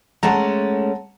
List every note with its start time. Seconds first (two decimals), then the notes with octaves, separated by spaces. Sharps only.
0.23 G#3 A3 C#4 F#5 A5 A#5